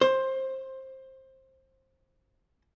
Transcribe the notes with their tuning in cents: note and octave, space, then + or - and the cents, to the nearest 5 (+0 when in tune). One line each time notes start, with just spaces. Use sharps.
C5 +20